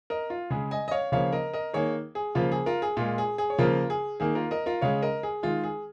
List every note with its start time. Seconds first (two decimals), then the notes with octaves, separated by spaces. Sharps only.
0.10 A#4 D#5
0.30 F4
0.50 C#3 G#3 G#4
0.71 D#5 G#5
0.88 D#5
0.91 C#5 F5
1.12 C#3 F3 A#3 C#5 F5
1.32 A#4 D#5
1.53 A#4 D#5
1.74 D#3 A#3 G#4 C#5
2.15 G#4
2.35 C#3 F3 A#3 F4
2.52 G#4
2.66 F4 A#4
2.82 G#4
2.97 A#2 G#3 F4
3.18 G#4
3.38 G#4
3.50 C#5
3.58 C#3 F3 A#3 F4 A#4
3.90 G#4
4.20 D#3 A#3 G#4
4.35 F4 A#4
4.51 A#4 D#5
4.66 F4 A#4
4.81 C#3 G#3 C#5 F5
5.02 A#4 D#5
5.23 G#4
5.43 D#3 G#3 F4
5.64 G#4